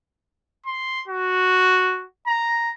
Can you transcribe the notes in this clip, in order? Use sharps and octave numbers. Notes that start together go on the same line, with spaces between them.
C6
F#4
A#5